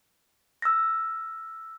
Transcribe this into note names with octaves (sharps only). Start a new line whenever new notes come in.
E6 F6 A#6